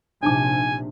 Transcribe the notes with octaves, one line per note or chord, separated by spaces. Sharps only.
A#1 C3 D4 D#4 G#5 D6